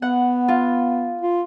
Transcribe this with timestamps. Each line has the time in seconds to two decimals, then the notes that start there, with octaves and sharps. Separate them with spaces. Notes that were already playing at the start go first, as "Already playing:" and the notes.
0.02 B3 F#5
0.48 F4
1.21 F4